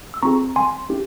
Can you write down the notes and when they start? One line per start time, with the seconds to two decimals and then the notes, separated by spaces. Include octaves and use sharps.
0.14 E6
0.22 C4 F4 G#4 A#5 C#6
0.56 G#5 C6
0.89 C#4 E4 G4